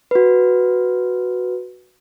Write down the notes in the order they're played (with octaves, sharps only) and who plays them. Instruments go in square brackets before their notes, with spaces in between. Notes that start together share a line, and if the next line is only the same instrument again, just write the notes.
[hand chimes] F#4 B4